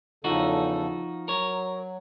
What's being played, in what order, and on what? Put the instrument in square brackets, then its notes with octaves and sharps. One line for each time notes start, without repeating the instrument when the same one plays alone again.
[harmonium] E2 C#3 A4 [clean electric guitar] F3 D#4 F#4
[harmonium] F#3 [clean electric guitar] A#4 C#5